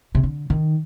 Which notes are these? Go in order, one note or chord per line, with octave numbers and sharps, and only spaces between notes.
C3
D3
D#3